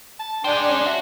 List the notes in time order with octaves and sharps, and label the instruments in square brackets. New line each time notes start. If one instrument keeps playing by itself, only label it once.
[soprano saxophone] A5
[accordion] D4 [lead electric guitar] G#4 C5 [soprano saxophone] G5
[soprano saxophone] C#4
[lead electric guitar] F#4 [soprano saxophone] E5